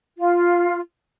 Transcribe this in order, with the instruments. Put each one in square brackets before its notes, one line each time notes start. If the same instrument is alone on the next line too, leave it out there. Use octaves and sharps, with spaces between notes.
[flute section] F4